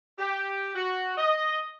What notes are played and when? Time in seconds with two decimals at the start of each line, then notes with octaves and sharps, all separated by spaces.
0.19 G4
0.75 F#4
1.18 D#5